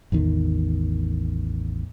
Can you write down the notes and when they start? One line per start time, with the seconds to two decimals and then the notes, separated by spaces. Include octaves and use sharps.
0.12 A1 E2 D#3